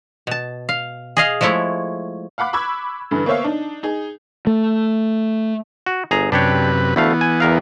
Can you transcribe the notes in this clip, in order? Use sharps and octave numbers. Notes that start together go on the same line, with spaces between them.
B2 A5
F5
G#4 D#5 F5
F3 G#3 A3 E4 C#5
F5 F#5 B5 D6 F#6
B5 C#6 D6 E6 G#6
G2 D3 E3
A#3 B3 C5 C#5 E5 F5
D4 D#4
D#4 G#4
A3
F#4
G1 G#4 A#5
F#2 C3 D4 G4 B4 C#5
D2 E3 A3 B3 F5
G#5
E2 A#4 F5